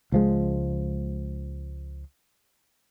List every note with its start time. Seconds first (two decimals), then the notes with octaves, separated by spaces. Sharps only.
0.12 C#2 F3 G#3